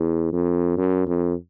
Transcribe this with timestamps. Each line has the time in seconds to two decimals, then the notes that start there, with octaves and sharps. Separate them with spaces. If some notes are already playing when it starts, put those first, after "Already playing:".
Already playing: E2
0.33 F2
0.78 F#2
1.07 F2